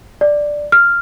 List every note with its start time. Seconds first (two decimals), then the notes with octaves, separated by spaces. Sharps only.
0.21 D5
0.72 F6